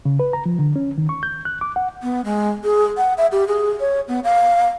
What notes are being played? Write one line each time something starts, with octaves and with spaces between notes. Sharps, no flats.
C#3
B4
A#5
F3
D3
C#4
D#3
C#6
G6
F#6
D6
F#5
B3
G#3
G#4
F#5
E5
G4
G#4
C#5
B3
F5